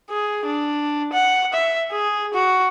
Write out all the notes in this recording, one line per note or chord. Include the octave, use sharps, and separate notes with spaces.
G#4
D4
F#5
E5
G#4
F#4